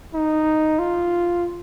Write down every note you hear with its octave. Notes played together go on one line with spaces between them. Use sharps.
D#4
F4